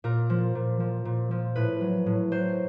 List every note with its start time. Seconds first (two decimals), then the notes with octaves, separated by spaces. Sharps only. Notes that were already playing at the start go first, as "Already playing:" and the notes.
0.04 A#2 A#4
0.30 F3
0.55 A#2
0.80 F3
1.05 A#2
1.31 F3
1.56 A2 B4
1.81 F#3
2.06 A2
2.32 F#3 C5